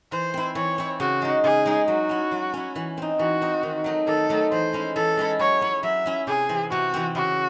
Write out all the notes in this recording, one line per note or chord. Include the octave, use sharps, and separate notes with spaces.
E3 C5
C4 E4
E3 C#5
C4 E4
C#3 F#4
G#3 D#4
C#3 G#4
G#3 D#4
F#3 F#4
C#4 E4
F#3
C#4 E4
E3
C4 D#4
E3 F#4
C4 D#4
D#3
F#3 A3 D#4
D#3 A4
F#3 A3 D#4
E3 C5
G#3 C#4 E4
E3 A4
G#3 C#4 E4
F#3 C#5
C#4 E4
F#3 E5
C#4 E4
C3 G#4
E3 C4
C3 F#4
E3 C4
C#3 F#4